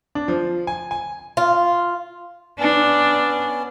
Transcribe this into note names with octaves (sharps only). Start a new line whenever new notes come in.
D4
F3
G#5
G#5
F4
B3 C#4 D4